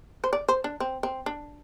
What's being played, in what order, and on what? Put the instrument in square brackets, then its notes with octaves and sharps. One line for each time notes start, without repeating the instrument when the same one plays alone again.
[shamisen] C5
D5
C5
D4
C4
C4
D4